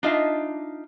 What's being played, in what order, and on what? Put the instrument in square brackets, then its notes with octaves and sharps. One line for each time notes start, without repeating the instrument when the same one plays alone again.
[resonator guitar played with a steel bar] D4 D#4 F4 D#5 E5 A5